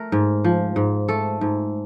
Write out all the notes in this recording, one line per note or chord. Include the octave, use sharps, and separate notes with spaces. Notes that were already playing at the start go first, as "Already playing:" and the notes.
Already playing: A3 A#4
G#2
F3
G#2
A3 A4
G#2